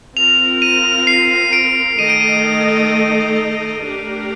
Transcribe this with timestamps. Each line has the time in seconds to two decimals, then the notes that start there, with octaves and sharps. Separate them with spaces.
0.17 C4 F4 A#4 F7
0.62 D#7
1.07 C7
1.53 D7
1.98 D#3 A3 D#4 A4 D#5 D#7
2.10 D7
2.21 D#7
3.81 A3 D4 G4 A#4